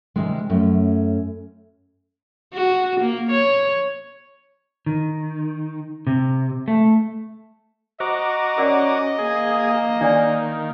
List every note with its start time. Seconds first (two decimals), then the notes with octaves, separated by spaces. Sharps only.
0.16 C3 D#3 G3 G#3
0.50 F#2 A3 C#4
2.53 F#4
3.01 A#3
3.31 C#5
4.86 D#3
6.07 C3
6.68 A3
8.00 F#4 C5 D#5 A#5 D6
8.58 C#4 A#4 D5 F#5
9.19 A#3 G#4
10.01 D#3 D4 D5 G#5